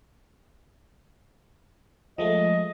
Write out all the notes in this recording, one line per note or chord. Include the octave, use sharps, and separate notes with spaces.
F3 G#3 A3 D#5